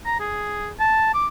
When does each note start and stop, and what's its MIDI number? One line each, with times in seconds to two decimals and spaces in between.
0.06 0.18 82
0.20 0.69 68
0.79 1.12 81
1.14 1.27 86